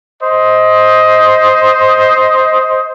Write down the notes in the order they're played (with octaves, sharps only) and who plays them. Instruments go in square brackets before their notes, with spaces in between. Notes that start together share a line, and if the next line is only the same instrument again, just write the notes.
[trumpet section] C5 D#5